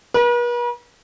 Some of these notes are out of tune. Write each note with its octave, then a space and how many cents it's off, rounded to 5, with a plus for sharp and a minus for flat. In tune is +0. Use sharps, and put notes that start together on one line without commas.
B4 -45